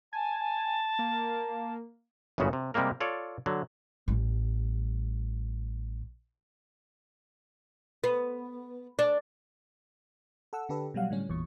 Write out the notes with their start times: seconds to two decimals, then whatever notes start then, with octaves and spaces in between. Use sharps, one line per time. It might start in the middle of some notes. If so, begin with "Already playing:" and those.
0.13 G#5 A5
0.99 A#3
2.38 G1 F#2 A#2 C#3 B3 F#4
2.53 C3
2.74 C3 G3 G#3 A#3 A#4
3.00 F4 A4 C#5 D5
3.46 D3 F#3
4.08 A1 G3
8.04 B3
8.99 D4
10.53 A4 F#5 E6
10.69 D3 D4 G4 A4 B4
10.94 B2 F#3 G3 F5 F#5
11.10 A2 D3 G3 C#4
11.29 G#1 E2 A#2 C#6